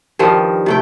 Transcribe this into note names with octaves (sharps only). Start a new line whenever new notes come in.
G2 D#3 F3 G3
C3 A3 G5